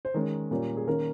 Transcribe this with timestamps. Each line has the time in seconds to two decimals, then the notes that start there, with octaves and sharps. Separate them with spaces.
0.05 C5
0.14 D#3 G#3 C#4 A#4
0.51 A#2 G3 A#3 C#4
0.77 G#4
0.87 D#3 A#3 C#4 A#4